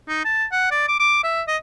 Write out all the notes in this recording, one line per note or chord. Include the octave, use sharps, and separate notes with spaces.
D#4
A5
F#5
D5
D6
D6
E5
D#5